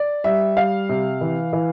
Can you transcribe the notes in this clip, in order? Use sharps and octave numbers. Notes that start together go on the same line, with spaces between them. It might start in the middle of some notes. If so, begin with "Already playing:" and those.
Already playing: D5
G3 E5
G3 F5
C3
E3
E3